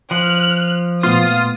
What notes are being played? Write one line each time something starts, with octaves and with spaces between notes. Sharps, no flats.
F3 F6 F#6
A#2 A3 B3 F4 F5 D#6